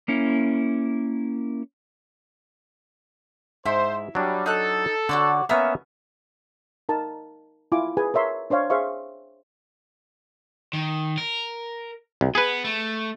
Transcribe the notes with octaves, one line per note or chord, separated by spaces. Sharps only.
A#3 C#4 E4
G#2 E4 C5
F#3 G3 D4
D#4 A4 F#6
D3 F#4 C#5 D5
A#3 B3 C#4 E5 A#5 F6
D#4 A#4 A5
E4 F4 G#5 D6
G#4 B4 G#5
A#4 C#5 E5 C6
D4 C5 C#5 F5
G#4 C5 E5 F5 C#6
D#3
A#4
C2
B3 G#4 B4
A3